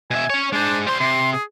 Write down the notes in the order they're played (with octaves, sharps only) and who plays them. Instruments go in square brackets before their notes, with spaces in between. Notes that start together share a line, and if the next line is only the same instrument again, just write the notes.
[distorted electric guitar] B2 E5 [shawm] G#5
[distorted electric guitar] C#4 C#5
[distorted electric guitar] G#3 C5 [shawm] D4
[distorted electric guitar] G3 C6 [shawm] C5
[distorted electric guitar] C3 [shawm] C6
[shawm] G#4